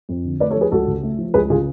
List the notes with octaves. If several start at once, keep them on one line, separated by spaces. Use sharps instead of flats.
F2
D3
A3 B4 D5
A4 C#5
F3
G#4 B4
C#2 F#4 A4
C#3
A3
F3
C#2 G#4 B4
C#3 F4 G#4